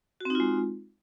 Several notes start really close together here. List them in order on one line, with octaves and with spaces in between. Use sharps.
F#4 C4 D#4 F4 G#3